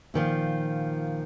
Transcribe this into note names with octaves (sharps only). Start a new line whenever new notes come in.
A#2 D#3 F3